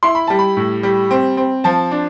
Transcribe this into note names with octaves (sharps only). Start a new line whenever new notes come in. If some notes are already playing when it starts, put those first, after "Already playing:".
E4 C6
B5
G3 A5
B5
A2
G3
C4
C4
F3 A5
D4